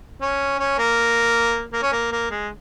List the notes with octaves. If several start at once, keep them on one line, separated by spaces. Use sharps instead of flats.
C#4
C#4
A#3
A#3
C#4
A#3
A#3
G#3